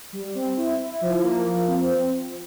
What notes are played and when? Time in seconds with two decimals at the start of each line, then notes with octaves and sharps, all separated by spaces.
0.13 G3
0.35 C4
0.57 E4
0.79 E4
1.01 F3
1.23 A#3
1.46 F3
1.68 C4
1.90 F3